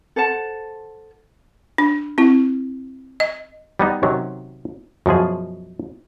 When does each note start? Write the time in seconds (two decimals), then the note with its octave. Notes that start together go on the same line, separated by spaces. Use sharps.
0.16 A4 C5 F#5 A5
1.78 D4
2.18 C4 E4
3.20 D#5
3.79 G3 B3 D#4
4.03 C3 D#3 F#3 C#4
5.06 F#2 B2 F3 G#4